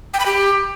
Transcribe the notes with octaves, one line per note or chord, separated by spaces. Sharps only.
G5
B5
G4